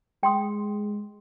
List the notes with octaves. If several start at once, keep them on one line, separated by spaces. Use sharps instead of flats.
G#3 G5 C6 D#6